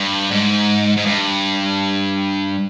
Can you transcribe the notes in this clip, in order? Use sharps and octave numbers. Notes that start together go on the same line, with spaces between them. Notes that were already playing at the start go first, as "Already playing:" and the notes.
Already playing: G2
G#2
G#2
G2